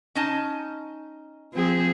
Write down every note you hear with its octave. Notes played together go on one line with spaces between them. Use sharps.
C#4 D#4 A5
F3 C4 G#4